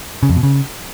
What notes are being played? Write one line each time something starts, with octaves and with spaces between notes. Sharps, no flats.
C#3
F2
B2
C#3